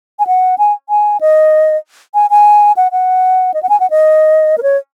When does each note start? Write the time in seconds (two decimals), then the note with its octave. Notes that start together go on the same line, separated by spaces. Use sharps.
0.19 G#5
0.27 F#5
0.58 G#5
0.89 G#5
1.21 D#5
2.14 G#5
2.30 G#5
2.77 F#5
2.92 F#5
3.54 D#5
3.63 F#5
3.69 G#5
3.80 F#5
3.90 D#5
4.58 A#4
4.63 C#5